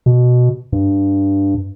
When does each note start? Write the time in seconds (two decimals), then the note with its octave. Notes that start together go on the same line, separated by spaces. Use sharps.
0.06 B2
0.72 G2